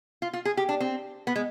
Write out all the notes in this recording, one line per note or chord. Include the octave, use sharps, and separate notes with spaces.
F4
F4
G#4
G4
D4
C4
B3
G#3